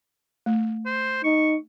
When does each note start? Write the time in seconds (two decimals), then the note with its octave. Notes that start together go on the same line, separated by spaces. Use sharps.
0.46 A3
0.86 C5
1.24 D#4 C#6